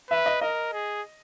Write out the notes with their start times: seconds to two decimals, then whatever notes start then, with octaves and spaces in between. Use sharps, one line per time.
0.11 B4 E5
0.26 D#5
0.41 A#4 D#5
0.73 G#4